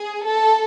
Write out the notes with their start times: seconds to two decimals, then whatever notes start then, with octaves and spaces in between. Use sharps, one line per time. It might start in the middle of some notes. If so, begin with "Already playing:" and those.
Already playing: G#4
0.25 A4